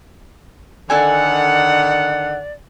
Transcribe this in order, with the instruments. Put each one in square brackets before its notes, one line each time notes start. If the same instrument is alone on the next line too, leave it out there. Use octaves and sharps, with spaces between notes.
[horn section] D3 D#3 F#5 [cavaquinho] A4 G#5 [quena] D5